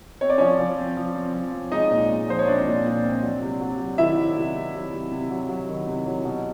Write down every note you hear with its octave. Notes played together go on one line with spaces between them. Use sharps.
C4 C#5
D5
F3 C#4 C#5
F3
C4
F3
C4
F3
C4
G#3 D#4 D#5
A#2
G#3
F3 C5
C#5
C4 D4 D5
A#2
A#2
C4
F#3
C3
F#3
F#3
D#3 E4 E5
F#3
C3
C3
F#3
C3
C3
F#3
F#3
D#3
C3
F#3
B2